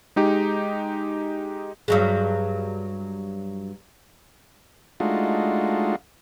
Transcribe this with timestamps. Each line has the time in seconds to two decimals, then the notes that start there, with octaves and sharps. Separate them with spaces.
0.16 G#3 D#4 G4
1.88 G2 F#3 G#3
5.00 G#3 A3 D4 D#4 F4 F#4